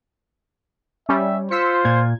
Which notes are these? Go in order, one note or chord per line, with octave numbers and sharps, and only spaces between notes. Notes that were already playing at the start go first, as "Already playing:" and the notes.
G3 C#4 E5
F4 C5 E6 B6 C#7
A#2 G#6